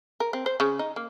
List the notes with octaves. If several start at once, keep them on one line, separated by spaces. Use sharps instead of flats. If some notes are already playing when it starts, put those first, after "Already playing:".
A#4
C4
C5
C#3
D#4
A#3